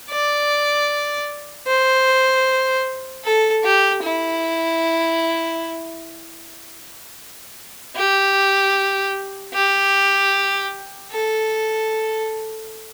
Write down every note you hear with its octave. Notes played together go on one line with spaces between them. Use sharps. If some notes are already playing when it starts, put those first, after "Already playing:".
D5
C5
A4
G4
E4
G4
G4
A4